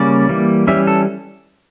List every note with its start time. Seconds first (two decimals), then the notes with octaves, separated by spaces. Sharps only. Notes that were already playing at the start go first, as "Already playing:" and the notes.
Already playing: C#3 G3 A#3 C#4 D5
0.29 E3 G3 A#3
0.67 E3 G3 C#4 E5
0.87 A4